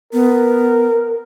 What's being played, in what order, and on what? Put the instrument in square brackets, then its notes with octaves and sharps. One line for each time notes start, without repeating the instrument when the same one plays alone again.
[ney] B3 [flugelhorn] A#4